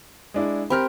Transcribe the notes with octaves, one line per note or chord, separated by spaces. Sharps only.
G#3 D4 E4
C4 G4 A#4 B5 F6